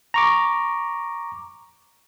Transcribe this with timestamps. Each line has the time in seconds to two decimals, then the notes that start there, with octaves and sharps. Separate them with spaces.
0.14 A#5 C#6 D6